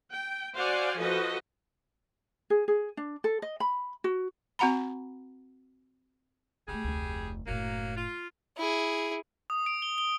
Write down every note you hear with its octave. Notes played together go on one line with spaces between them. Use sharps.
G5
F#4 C5 D5 F5 F#5 G#5
F3 F#4 A4 B4 D#5
G#4
G#4
D4
A4
D#5
B5
F#4
C4 F#4 F#5 A#5 B5
D3 G3 A3 G#4
F1 D2
F#1 A2 F#3 A#3
F4
E4 G#4
D#6
D7
G7
G7